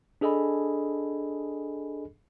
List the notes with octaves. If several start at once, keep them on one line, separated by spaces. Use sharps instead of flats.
D4 G#4 A4 D#5 G#5 B5